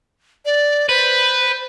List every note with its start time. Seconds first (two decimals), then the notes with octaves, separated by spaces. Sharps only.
0.45 D5
0.89 B4 C5